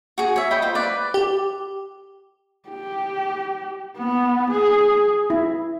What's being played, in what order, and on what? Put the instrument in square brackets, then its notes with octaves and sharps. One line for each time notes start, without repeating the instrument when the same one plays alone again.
[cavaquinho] F#4 G#4
C#5 E5
D#5 G5 B5
F4 C5
B4 D5
[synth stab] G4
[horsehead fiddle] G4
B3
G#4
[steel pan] E4